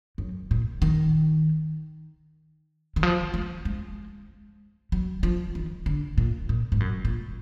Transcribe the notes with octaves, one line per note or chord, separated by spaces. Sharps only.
F#2
A#2
D#3
D#3
F3
G#3
G#3
F#3
F3
D#3
D3
A#2
A#2
G#2
F#2
A#2